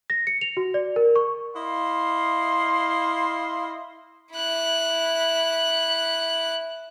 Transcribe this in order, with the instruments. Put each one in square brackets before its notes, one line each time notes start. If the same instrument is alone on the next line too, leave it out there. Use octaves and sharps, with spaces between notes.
[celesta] A#6
C#7
F7
F#4
D5
A#4
C#6
[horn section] E4 D#5 F5 C6
[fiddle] E4 F#6